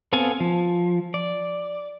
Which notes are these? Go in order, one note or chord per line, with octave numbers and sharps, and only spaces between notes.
B3 C4 A4 F5 G#5
F3
D5